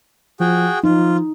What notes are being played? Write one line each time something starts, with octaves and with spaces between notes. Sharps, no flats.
F3 F#4 G#4 G5
F3 D#4 F4